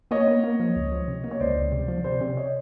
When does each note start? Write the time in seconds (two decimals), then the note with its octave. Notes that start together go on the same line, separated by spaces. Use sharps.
0.11 A#3 C#5 D#5
0.27 A#3
0.44 A#3
0.60 F3
0.76 C#2
0.92 F3
1.08 C3
1.24 A#3
1.31 C#5
1.40 C#2 C5 D5
1.56 C#2
1.72 C3
1.88 F3
2.04 C3 C5 D5
2.21 C3
2.37 C#5 D#5